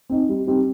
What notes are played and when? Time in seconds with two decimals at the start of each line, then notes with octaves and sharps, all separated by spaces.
0.10 C4 D#4
0.29 G3
0.47 C4 D#4 G4